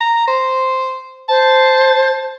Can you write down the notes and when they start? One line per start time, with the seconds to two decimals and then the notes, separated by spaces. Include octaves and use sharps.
0.01 A#5
0.28 C5
1.29 C5 A5